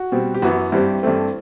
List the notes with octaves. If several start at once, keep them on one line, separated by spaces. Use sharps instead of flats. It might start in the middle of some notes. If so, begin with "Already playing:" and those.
Already playing: F#4
B2 G3 C4
G4
F#2 E3 B3 F#4
G2 E3 G3 C4 G4
G2 E3 A3 C4